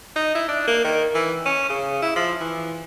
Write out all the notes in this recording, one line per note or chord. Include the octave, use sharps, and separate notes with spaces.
D#4
E4
D4
A#3
D#3
E3
C#4
C#3
E4
F3
E3